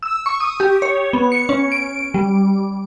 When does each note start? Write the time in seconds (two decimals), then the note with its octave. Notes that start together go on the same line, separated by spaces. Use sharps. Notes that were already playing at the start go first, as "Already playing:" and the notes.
0.03 E6
0.26 C#6
0.40 D#6
0.60 G4
0.82 C#5
1.13 B3
1.32 C#7
1.49 C#4
1.72 D7
2.14 G3